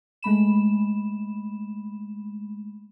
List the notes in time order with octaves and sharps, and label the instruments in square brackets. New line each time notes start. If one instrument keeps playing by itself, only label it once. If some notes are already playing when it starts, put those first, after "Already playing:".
[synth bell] G#3 A3 B5 E7